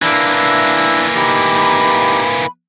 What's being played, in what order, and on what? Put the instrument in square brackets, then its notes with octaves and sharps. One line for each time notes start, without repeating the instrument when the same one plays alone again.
[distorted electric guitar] E3 A#3 [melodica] D4 E4 E6
[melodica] D#4 G4 [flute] B5